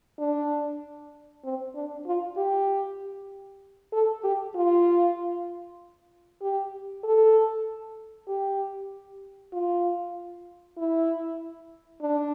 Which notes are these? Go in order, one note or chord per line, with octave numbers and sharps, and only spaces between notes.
D4
C4
D4
F4
G4
A4
G4
F4
G4
A4
G4
F4
E4
D4